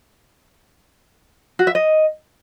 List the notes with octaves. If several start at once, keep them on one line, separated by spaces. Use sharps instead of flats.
F#4
E5
D#5